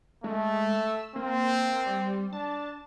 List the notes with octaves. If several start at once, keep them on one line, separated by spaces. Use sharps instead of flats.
G#3 A3
E6
A#3 C4
G3
D4 A5